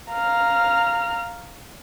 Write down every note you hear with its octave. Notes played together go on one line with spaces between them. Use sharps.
F5 A#5 F6